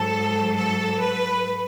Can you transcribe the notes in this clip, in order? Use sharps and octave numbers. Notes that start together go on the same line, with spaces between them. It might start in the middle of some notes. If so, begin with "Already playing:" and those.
Already playing: G#2 F#3 A4
A4
B4